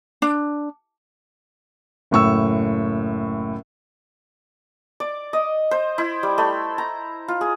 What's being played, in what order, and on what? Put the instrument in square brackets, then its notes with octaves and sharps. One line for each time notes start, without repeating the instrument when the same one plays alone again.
[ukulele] D4
[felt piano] F#1 A2 C#6 E6
[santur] D5
D#5
C5
E4
G3
A3
A#5
F4
G#4